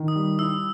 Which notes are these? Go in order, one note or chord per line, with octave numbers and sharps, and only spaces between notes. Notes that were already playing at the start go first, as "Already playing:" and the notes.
Already playing: D#3
D#6
G3
E4 E6